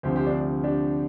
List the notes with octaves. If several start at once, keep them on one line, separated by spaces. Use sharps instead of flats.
D2 C3 F3 G4 C5
G4 C5
D4
D4 G4